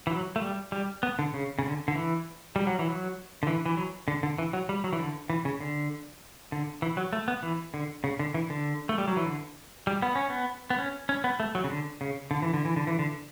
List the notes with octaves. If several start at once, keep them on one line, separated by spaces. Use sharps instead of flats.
E3
F#3
A3
G3
G3
B3
D3
C#3
C#3
D3
D3
E3
G3
F#3
E3
F#3
D3
E3
E3
F#3
D3
D3
E3
F#3
G3
F#3
E3
D3
E3
C#3
D3
D3
E3
F#3
A3
B3
E3
D3
C#3
D3
E3
D3
A3
G3
F#3
E3
D3
G3
B3
C#4
B3
B3
C#4
C#4
B3
A3
F#3
C#3
D3
C#3
D3
E3
D3
E3
D3
E3
D3